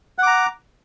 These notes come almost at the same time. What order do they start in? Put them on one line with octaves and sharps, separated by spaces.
F#5 D6 A#5